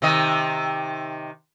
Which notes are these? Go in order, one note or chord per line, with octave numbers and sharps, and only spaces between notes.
C3 D#3 D#5